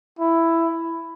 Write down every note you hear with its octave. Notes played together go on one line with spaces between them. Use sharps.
E4